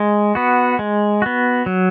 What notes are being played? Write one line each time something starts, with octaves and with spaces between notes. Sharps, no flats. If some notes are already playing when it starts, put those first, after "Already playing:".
Already playing: G#3
B3 F#4
G#3
B3 F#4
F#3